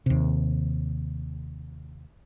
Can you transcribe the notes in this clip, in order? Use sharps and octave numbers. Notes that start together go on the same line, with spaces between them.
D#2 C3